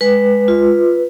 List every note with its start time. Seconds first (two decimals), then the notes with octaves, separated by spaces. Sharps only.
0.01 G#3 B4
0.48 F4